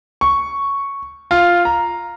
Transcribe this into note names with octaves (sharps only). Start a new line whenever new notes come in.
C#6
F4
A#5